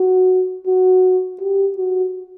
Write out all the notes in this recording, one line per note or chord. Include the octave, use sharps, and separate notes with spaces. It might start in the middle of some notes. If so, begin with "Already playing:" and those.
Already playing: F#4
F#4
G4
F#4